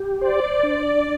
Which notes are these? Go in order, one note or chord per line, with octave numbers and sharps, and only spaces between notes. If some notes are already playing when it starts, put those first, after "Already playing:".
Already playing: G4
C5 D5
D4